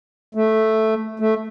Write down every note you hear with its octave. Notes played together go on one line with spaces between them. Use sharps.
A3
A3